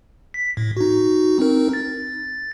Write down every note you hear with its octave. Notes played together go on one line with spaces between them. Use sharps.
B6
A2
D#4 F#4
C4 D#4 A#4
A6